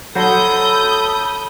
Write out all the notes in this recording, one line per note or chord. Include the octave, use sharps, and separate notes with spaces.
F#3 A4 C5 B5 D#6 G6